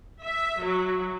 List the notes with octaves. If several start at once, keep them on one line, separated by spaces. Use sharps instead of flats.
E5
F#3